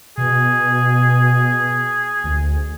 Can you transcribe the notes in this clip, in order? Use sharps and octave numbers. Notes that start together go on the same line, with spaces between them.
B2 G#4
D2